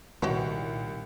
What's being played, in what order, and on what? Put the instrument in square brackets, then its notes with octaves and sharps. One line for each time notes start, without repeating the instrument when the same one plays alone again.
[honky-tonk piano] C2 [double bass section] A#2 [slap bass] D#3 [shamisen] F#4 G4 C#5